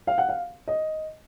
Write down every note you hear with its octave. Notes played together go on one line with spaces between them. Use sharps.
F5
F#5
F5
D#5